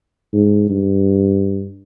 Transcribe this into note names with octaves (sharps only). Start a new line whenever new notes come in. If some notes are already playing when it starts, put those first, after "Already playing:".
G#2
G2